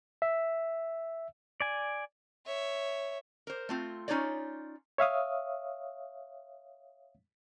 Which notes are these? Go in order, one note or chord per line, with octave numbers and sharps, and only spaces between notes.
E5
D5 G#5
C#5 E5
A#4 C5
A3 C4 F4
C#4 D#4 F4 C#5 D5
C#5 E5 F5 D#6